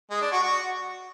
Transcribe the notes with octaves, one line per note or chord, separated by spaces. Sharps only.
G#3
D4
F#4
F#4